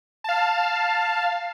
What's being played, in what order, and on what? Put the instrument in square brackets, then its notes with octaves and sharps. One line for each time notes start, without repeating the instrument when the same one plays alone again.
[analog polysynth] F5 A5